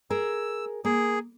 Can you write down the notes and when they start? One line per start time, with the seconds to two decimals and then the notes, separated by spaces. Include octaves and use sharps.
0.10 G#4 A#4 E6
0.85 A#3 G#4